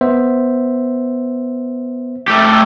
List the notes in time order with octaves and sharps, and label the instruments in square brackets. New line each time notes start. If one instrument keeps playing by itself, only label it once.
[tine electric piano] B3 C5 E5
[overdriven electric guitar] A3 G4